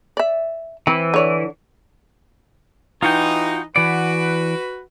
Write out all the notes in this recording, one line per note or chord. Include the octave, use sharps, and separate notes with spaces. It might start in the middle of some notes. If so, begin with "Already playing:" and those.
D5 E5
E3 C4
D3 C#5 D5
E3 D#4 F4 F#4 G5
E3 F#4 B4 D5